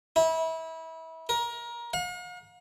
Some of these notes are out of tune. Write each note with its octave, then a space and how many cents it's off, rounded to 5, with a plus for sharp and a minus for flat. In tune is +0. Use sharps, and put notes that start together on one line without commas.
E4 -30
A#4 +25
F5 +45